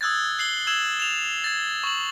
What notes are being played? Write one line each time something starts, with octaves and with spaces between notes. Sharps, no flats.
D#6 E6 F#6 G#6 A6
F#6 C7 F#7 G7
E6 G#6 E7 F#7
E7 F7
G#6 A6
C#6 F#7